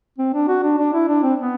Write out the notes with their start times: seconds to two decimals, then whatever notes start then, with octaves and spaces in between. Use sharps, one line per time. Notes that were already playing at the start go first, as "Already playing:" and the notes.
0.18 C4
0.34 D4
0.48 F#4
0.63 D4
0.78 D4
0.93 E4
1.08 D4
1.23 C4
1.38 B3